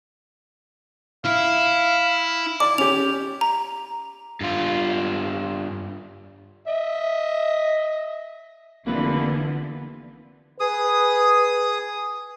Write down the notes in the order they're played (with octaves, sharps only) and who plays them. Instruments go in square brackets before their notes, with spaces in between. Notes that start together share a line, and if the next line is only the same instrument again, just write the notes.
[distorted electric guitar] E4 [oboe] F5
[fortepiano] D5 [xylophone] D6
[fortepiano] C#4 G4 [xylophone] F7
[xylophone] A#5
[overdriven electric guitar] G2 F4
[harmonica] D#5 E5
[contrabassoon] F1 [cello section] D3 E3 B3 [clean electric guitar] A#3 B4
[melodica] G#4 D#6 [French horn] B4